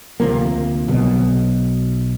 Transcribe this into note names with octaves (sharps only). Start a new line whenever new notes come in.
D2 C3 F3 A#3
B1 B2